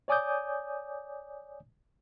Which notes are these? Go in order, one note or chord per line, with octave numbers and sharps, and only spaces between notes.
C#5 D5 G#5 D6 D#6 G6